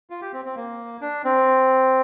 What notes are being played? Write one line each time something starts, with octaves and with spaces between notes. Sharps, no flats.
F4
G4
C4
C4
A#3
D4
C4